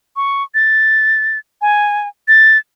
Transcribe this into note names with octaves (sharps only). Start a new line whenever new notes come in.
C#6
A6
G#5
A6